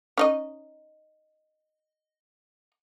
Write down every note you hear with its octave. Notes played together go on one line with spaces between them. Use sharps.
C#4 D#4 D#5